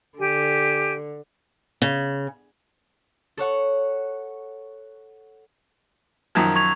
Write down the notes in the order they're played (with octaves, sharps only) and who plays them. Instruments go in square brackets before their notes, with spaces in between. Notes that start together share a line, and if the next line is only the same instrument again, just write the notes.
[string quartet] D3 [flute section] G4 G#5
[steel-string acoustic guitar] C#3
[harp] A4 C#5 F#5 C#6
[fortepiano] F#2 D#3 F3 [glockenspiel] A#5 G#6
[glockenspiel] C#6 G#6 F7